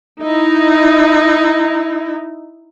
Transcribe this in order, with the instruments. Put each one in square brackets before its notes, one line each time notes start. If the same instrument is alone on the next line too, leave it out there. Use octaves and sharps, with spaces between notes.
[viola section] D#4 E4